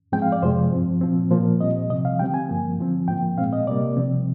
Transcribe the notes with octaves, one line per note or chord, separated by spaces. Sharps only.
G#2 F3 G#3 C4 G5
F5
D5
F2 C3 F3 G#3 C5
G2 F3 C4
A#2 F3 C4
A#2 F3 A#3 C5
A#2 G3 C4 D#5
C3 F3 C4 D#5
F5
D3 G3 C4 G5
G#5
G2 F3 A#3
D3 F3 C4
G#2 F3 A#3 G5
A#2 G#3 C4 F5
D#5
C3 G3 A#3 D5
C3 F3 C4